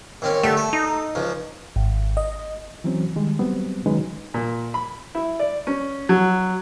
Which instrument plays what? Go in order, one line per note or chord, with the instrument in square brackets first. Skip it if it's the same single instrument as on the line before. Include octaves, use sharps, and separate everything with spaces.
[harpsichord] D#2 C4 C#4
[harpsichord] D3 G4 D5 [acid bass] A3
[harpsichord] A4
[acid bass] D#4
[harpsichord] C#2 F3
[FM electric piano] G#1
D#5
[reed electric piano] E3 F#3 C4 C#4
D#3 G3 G#3
F#3 G3 B3 C4
D#3 F#3 G#3 C#4 D#4 B4
[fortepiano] A#2
B5
E4
D5
C#4
F#3